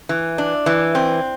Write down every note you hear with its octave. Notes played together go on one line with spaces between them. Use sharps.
E3
D4
E3
C4